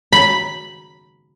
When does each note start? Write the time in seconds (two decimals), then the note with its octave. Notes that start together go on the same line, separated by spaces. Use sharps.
0.12 B5